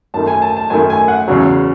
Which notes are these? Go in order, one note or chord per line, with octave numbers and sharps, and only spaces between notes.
F#2 D#3 A3 A5
G#5
A5
A5
F#2 D#3 A3 G#5
G#5
F#5
E2 C#3 F#3